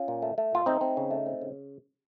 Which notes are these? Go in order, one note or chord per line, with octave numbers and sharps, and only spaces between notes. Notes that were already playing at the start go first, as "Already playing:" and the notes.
Already playing: C#4 F4
A#2
A3
A3
A#2 F4
A3 C4 D#4
C4
C#3
A3
C4
C#3